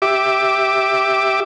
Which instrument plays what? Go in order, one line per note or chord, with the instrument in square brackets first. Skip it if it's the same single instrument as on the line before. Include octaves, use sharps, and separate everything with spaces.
[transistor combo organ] G4 E5 D6